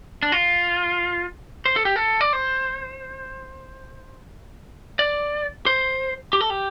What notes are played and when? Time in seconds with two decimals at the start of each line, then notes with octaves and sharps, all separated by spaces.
0.23 D4
0.32 F4
1.66 C5
1.76 A4
1.85 G4
1.96 A4
2.21 D5
2.33 C5
4.99 D5
5.66 C5
6.33 G4
6.41 A4
6.50 G4